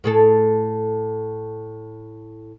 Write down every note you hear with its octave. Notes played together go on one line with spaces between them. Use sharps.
A2 G#4 A4